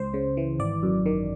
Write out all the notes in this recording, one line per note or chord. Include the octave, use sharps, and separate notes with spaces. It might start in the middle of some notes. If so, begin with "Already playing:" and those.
Already playing: C#2 C5
C#3
E3
G#1 D5
F#2
D#3